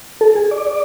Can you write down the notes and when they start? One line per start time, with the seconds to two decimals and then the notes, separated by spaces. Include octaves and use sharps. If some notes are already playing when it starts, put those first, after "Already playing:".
0.21 A4
0.35 G#4
0.51 D5
0.67 D5